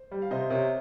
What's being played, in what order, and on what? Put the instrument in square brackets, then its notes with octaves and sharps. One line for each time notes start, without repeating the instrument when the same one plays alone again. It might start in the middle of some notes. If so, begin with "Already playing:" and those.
Already playing: [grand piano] C5
[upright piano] G3
[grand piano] F5
[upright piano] C3 [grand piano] C5 D#5
[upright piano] C3 [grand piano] A#4 C#5